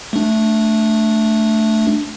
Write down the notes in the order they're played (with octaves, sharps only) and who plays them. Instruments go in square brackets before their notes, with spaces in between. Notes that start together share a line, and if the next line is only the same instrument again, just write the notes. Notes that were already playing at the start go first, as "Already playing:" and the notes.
[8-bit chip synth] A3 D4